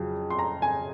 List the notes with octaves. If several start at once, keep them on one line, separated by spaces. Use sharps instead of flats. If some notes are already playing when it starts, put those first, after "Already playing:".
Already playing: F2 C#3 F#3
C6
A#5
G#5